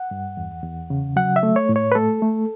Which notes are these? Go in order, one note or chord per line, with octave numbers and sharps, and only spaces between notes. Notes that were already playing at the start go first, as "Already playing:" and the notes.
Already playing: F#5
G2
E2
E2
C#3
F#3 F#5
E5
A3
C#5
A2
C#5
B4
A3 A4
A3